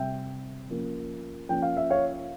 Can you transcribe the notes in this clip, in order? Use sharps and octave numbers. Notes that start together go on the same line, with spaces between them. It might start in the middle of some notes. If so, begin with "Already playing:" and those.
Already playing: C3 G3 C4 E5 G5
F3 A#3 C#4
F3 A#3 C#4 G5
F5
E5
C#5 F5